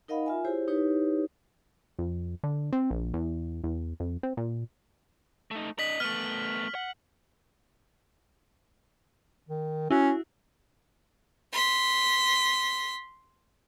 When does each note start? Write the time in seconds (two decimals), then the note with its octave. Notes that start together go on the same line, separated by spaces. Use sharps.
0.08 D#4 A#4 D#5 F5 F#5 B5
0.26 F4 E5 G#5
0.45 E4 G4 G#4 C5 C#5
0.68 D#4 E4 G4 B4 C#5
1.99 F2
2.44 D3
2.73 C4
2.90 A#1
3.14 E2
3.64 E2
4.00 F2
4.23 C4
4.37 A#2
5.51 A3 D#4
5.79 D4 D#5 B6 F#7
6.00 A3 B3 F6
6.75 F#5
9.49 D#3
9.91 C#4 E4 F#4
11.53 C6 B6